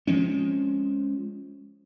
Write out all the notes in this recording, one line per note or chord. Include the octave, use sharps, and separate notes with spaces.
F3 G#3 C4 C#4